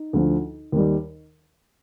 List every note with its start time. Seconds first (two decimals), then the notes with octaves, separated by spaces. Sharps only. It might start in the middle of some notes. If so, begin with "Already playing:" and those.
Already playing: D#4
0.13 D2 D3 F3
0.72 D#2 D#3 G3